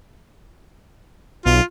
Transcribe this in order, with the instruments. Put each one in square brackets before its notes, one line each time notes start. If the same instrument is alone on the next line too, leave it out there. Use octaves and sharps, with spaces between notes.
[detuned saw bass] B1 [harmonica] F4